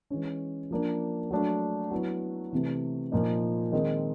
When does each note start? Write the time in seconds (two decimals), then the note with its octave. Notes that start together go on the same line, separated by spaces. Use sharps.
0.10 E3 G#3 C#4
0.71 F3 A#3 D4
1.31 F#3 A3 D4
1.91 F#3 B3 E4
2.52 C3 E3 A3
3.12 A#2 F3 A#3 D#4
3.72 D#3 G#3 C4 D#4